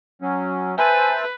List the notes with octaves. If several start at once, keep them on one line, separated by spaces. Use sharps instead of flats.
F#3 C#4
B4 C5 E5 G#5 A5